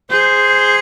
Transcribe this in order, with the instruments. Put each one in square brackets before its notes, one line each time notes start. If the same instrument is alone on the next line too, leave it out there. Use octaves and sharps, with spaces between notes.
[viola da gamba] G#4 [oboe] C5